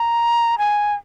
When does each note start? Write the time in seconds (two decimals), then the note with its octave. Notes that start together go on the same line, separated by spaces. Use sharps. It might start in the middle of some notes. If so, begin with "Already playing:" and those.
Already playing: A#5
0.58 G#5